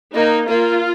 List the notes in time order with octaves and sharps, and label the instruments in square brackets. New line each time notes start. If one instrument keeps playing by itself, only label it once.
[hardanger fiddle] A#3 [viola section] D#4
[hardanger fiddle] A#3 [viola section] F4